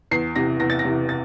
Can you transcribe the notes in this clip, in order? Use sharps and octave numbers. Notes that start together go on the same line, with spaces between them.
E2 C7
C3 E3 A#6
E2 A#6
A6
A#6
C3 E3
A6